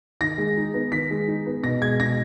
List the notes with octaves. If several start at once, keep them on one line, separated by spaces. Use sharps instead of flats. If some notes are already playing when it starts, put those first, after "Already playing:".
D#3 A#6
G#3
D#4
B3
D#3 B6
G#3
D#4
B3
B2 A#6
G#3 G#6
B2 A#6